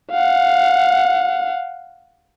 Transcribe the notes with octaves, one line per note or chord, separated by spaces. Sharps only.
F5 F#5